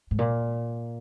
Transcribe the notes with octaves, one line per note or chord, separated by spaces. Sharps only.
G#2
A#2